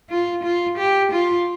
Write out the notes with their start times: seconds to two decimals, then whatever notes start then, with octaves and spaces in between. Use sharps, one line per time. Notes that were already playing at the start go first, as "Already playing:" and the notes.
0.10 F4
0.43 F4
0.78 G4
1.11 F4